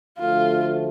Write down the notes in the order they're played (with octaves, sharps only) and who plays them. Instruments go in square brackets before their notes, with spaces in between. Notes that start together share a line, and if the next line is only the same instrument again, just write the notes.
[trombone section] D2 D3 F3 A3 [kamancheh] F4